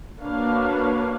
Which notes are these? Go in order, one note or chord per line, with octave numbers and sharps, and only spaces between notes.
A#3 D4 F#4 B4 C#5 F5